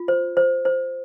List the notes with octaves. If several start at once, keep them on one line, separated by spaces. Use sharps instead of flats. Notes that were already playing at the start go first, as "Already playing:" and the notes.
Already playing: F4
C5
C5
C5